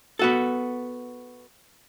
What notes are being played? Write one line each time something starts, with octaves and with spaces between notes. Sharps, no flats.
B3 F#4 A4